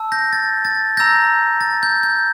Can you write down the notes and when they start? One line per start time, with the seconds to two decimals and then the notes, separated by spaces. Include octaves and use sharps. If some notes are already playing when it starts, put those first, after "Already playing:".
Already playing: A5 E6
0.12 G6 A#6
0.33 A6
0.65 A6
0.97 A#5 E6 G6 A#6
1.61 A6
1.83 G6
2.03 G6